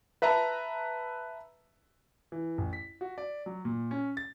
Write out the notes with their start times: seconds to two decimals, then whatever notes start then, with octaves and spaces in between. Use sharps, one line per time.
0.22 B4 E5 A5 A#5
2.32 E3
2.58 A1
2.73 B6
3.01 F#4
3.18 D5
3.46 F#3
3.65 A#2
3.91 C#4
4.17 A6